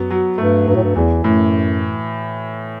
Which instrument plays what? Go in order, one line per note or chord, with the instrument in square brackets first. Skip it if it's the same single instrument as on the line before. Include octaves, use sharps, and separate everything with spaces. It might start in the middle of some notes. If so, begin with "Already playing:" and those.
Already playing: [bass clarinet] F#2 [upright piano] F#3 B3
[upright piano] F#3
[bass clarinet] G2 [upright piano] A3
[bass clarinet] G2 [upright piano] F#3
[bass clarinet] A2
G2
[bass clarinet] E2 [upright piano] E3
[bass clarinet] F#2 [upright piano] A2